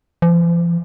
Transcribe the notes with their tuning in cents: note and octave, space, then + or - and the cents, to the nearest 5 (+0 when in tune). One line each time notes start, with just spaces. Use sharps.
F3 -45